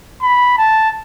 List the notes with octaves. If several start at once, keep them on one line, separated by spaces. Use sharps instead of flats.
B5
A5